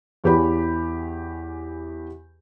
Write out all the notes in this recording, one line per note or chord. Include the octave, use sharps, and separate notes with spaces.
E2 E3 G4 C#5 B5